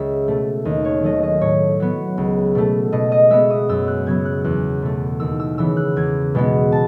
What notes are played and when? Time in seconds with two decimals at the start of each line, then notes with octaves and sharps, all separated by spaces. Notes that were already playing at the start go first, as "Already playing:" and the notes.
Already playing: C#2 E5
0.28 B2 A3
0.65 D#2 D#5
0.85 C#5
1.01 D#3 F#3 A3 D#5
1.23 D#5
1.41 A2 C#5
1.80 F#3 B3
2.18 C#2
2.55 B2 A3
2.92 B2 D#5
3.12 D#5
3.30 G#3 B3 E5
3.50 D#6
3.69 F#2 E6
3.88 F#6
4.06 C#3 F#3 B3 G#6
4.25 F#6
4.44 E2 F#6
4.82 B2 A3
5.20 D#2 E6
5.40 E6
5.58 C#3 E3 B3 E6
5.77 F#6
5.96 E2 G#6
6.35 B2 G#3 B3
6.72 A5